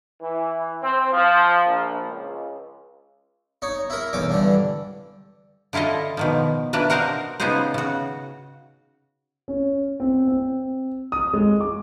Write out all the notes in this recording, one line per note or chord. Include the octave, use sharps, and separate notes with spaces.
E3
C4
F3
A#1
C#2
D#4 C#5
E4 A#4
B1 E2 C#4 D6
G2 D3 E3
D3 E4 F4 A4 D#5
B2 D#3 F3
A#3 D4 B4 E5
F#4 A#4 C5 D#5 F5
C#3 B3 D#4 F#4 G#4 C5
C#3 F#4
C#4
C4
C4
D#6
G#3
D6